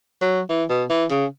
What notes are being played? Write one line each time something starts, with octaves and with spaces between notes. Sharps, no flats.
F#3
E3
B2
E3
C#3